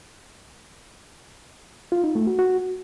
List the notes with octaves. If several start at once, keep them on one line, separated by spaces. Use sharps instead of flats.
F4
D#4
A3
F#4
F#4